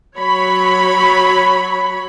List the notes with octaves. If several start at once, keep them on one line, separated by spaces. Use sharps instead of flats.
F#3 C#5 B5